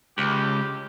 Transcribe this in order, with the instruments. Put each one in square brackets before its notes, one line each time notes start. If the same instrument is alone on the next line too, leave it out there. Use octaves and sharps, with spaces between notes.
[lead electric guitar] C#2 [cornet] G4